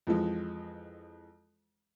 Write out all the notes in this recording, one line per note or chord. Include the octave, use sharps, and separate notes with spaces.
F2 E3 F3 G#3